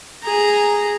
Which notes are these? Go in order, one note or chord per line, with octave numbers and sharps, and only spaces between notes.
G#4 A#5